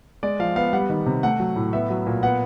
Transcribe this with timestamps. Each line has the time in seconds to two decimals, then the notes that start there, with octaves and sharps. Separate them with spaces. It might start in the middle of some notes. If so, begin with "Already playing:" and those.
0.23 G#3 D5
0.40 F3 F5
0.56 B3 F5
0.73 G3 F#5
0.90 D#3
1.06 C3
1.23 A3 F#5
1.40 F#3
1.56 A2
1.73 B3 E5
1.90 F#3
2.06 A#2
2.23 B3 F#5